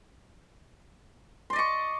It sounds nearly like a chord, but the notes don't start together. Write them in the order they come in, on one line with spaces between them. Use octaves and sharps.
C6 D5 D#5 C#6